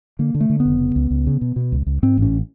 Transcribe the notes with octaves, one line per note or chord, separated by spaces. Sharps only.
D3 A#3
D3
A3
D3
B3
F1
C#3
C#2
C#2
C#3
B2
B2
C#2
C#2
G#2 C4
A1 C#4